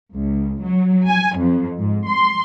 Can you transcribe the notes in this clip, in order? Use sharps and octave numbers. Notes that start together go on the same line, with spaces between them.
C#2
F#3
G#5
F2
G#2
C6